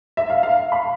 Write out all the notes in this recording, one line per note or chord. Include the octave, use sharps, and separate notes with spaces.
E5
F5
F5
B5